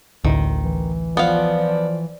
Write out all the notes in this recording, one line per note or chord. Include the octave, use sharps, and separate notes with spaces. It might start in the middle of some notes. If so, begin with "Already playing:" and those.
A1 D2 D#3
E3
F3 B3 D5 F5